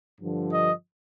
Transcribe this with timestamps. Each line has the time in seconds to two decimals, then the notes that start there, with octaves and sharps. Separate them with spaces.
0.21 G2 D3 F3
0.51 D#5